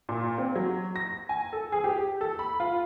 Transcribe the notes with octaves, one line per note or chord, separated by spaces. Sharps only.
A#2
C4
F#3
A#6
G#5
A4
G#4
G4
A4
B5
F4